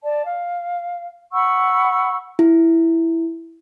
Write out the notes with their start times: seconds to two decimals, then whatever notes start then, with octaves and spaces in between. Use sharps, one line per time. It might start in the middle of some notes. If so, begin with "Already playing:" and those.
0.02 D5 A5
0.25 F5
1.33 F#5 B5 C#6 E6
2.39 E4